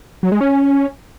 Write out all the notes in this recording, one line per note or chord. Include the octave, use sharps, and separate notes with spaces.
F#3
G#3
C#4